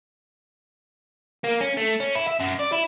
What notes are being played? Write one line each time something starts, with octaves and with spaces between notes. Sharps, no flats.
A#3
C#4
A3
C#4
E4
E5
F#2
D5
E4